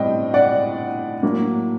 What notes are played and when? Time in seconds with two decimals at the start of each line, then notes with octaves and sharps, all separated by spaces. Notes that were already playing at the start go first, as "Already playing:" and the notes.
Already playing: A2 G3 C4 D#5 G5
0.34 D5 F#5
1.23 A2 F#3 A#3